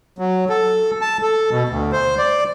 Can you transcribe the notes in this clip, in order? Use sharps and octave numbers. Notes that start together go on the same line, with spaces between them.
F#3
A4
A5
A4
B2
D2
C5
D5